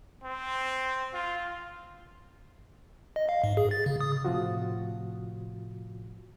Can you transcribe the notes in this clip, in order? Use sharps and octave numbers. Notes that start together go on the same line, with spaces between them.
C4
F4
D#5
F5
G#2
G#4
A6
C#3
D#6
A2 C3 F3 F4 F#4